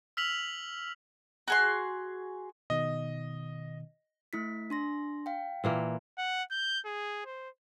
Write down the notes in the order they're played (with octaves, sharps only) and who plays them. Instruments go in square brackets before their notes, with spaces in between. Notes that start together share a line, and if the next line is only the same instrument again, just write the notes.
[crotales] E6 F6 B6 F7 F#7
[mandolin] F#4 G#4 C6
[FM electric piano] B2 D#3 [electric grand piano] D#5
[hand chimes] A3 E4 B6
D4 C6 A#6
F5 G5
[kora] A#2 E3 A#3
[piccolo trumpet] F#5
G6
G#4
C5